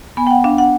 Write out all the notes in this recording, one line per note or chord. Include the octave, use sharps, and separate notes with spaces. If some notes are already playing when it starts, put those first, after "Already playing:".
B3 G#5
G5
F#5
D4 F5
F#5